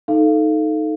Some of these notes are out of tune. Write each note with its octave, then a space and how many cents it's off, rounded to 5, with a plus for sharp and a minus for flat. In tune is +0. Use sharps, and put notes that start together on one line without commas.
D#4 +0 A4 +0 F5 -20